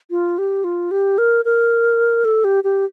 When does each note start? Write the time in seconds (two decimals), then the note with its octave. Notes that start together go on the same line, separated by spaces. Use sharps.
0.11 F4
0.38 G4
0.64 F4
0.91 G4
1.18 A#4
1.45 A#4
2.25 A4
2.44 G4
2.64 G4